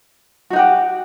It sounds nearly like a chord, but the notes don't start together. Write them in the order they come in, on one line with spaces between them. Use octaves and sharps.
F#4 D#4 F#5 G4